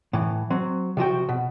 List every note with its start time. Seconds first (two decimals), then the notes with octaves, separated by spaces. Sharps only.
0.13 A2 E3
0.50 F#3 C4
0.97 C3 F3 F#4 G5
1.29 B2